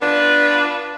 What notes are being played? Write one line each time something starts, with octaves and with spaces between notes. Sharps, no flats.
B3 D4 F4 B4